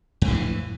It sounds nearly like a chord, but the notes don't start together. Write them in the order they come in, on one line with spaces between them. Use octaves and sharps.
F2 D3 A2 E3